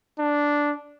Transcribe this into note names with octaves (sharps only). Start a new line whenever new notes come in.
D4